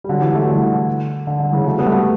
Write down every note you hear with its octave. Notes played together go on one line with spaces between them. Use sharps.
G3
D3 F#3
E3 G3
F#3 A3
D3
E3
D3
D3
D3
C#3 E3
F#3 A3
G3 B3
A3
G3 B3